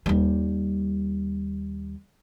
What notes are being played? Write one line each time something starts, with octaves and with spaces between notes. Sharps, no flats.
D#2 G3